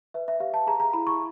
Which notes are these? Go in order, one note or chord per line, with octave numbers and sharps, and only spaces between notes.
B4 E5
E5
G4 F5
A5
G#4 A#5
A#5
E4 B5
C#6